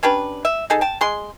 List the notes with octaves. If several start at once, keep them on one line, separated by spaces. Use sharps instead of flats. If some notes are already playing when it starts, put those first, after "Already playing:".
C#4 D4 G4 B4
E5
D#4 G#4 A4
G5 A5
G#3 G#4 C6